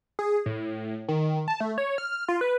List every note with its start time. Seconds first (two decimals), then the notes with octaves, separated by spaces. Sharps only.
0.19 G#4
0.46 A2
1.09 D#3
1.48 A5
1.60 A3
1.78 C#5
1.98 F6
2.29 F4
2.41 B4